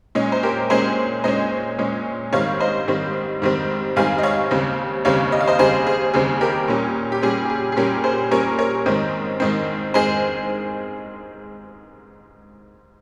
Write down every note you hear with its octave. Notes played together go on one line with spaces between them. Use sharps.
A#2 G#3 C#4
C5
G4 A#4
A#2 G#3 C#4 G#4 C5
A#2 G#3 C#4 C5 D#5
A#2 G#3 C#4
G#2 D#3 G3 C4 C#5 F5
C5 D#5
G#2 D#3 G3 C4
G#2 D#3 G3 C4
G#2 D#3 G3 C4 F5 G#5
D#5
C#5 F5
D#2 C#3 G3 C4
D#2 C#3 G3 C4 C#5 F5
D#5
F5
C5 D#5
D#2 C#3 G3 C4 G#4 C5
G#4
D#2 C#3 G3 C4 G#4
G4 A#4
A#2 G3 C#4
G4
A#2 G3 C#4 G#4
G4
G#4
G#4
A#2 G3 C#4 G4 A#4
G#4 C5
A#2 G3 C#4 A#4 C#5
A#4 C#5
G#2 D#3 G#3 C4
G#2 D#3 G#3 C4
D#3 G#3 C4 G#4 C5